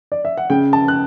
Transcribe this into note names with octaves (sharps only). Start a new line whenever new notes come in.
D5
E5
F#5
C#3 G5
A5
F#6